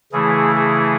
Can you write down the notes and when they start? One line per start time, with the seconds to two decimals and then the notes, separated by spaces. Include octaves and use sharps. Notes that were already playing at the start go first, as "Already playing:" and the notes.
0.12 C#3 E3 A3 E4 G#4
0.56 G#4